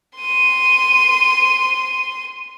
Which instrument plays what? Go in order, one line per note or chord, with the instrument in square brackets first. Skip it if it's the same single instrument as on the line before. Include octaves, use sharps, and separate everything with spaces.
[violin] C6 D#7